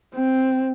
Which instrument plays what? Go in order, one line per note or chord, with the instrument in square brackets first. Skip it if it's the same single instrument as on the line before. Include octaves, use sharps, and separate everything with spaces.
[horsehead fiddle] C4